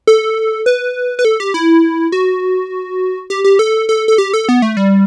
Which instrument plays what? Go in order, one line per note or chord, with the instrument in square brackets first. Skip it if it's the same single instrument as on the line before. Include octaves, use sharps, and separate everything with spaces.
[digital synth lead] A4
B4
B4
A4
G4
E4
F#4
G4
G4
A4
A4
A4
G4
A4
B3
A3
G3